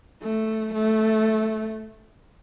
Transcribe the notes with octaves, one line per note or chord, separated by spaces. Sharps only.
A3
A3